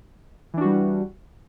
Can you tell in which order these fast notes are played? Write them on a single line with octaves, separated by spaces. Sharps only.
E3 D4 F#4 G3